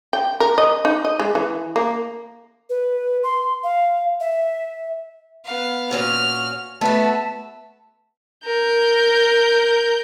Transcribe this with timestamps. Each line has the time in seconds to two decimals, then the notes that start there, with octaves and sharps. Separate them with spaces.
0.13 G5
0.40 A#4
0.58 D#5
0.85 D#4
1.05 D#5
1.20 G#3
1.35 E3
1.76 A#3
2.70 B4
3.23 C6
3.64 F5
4.20 E5
5.44 B3 F5
5.91 A#2 C#4 F#4 F6
6.81 A3 B3 F#4 E5 A5
8.45 A#4 G6